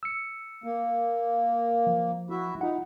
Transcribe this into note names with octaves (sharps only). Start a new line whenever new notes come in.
E6 C#7
A#3
F3
E4 F#4 E5
D#4 F4 F#5